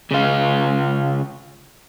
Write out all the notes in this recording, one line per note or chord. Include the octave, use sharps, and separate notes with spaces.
C#3 F4